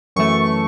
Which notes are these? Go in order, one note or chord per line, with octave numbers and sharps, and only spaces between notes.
F#2 E3 A3 C#6